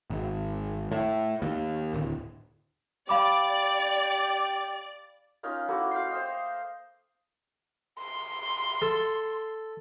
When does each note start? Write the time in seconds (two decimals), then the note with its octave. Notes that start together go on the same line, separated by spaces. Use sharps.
0.10 G#1
0.92 A2
1.42 D#2
1.94 D1
3.09 G4 D5 F5 B5 D6
5.43 C#4 D#4 F4 A#4
5.68 A3 A#3 E4 F#4
5.91 F5 G5 C6
6.11 C5 D#5
8.00 C6
8.82 A4